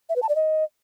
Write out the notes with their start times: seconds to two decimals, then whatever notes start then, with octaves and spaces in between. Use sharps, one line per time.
0.09 E5
0.16 B4
0.22 A5
0.29 D5
0.36 D#5